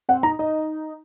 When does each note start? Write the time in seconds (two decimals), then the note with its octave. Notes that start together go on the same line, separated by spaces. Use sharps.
0.09 C4 F#5
0.23 D#4 A#5
0.39 D#4 D#5